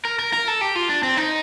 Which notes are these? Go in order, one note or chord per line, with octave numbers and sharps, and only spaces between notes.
A#4
A#4
A#4
A4
G4
F4
D4
C4
D#4